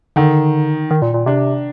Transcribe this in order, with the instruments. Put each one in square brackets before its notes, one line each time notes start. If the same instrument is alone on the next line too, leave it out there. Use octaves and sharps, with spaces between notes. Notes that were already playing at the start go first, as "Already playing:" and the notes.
[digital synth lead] D3 [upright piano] D#3
[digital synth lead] D#3
A#2
A#2
[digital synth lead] C3 [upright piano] D4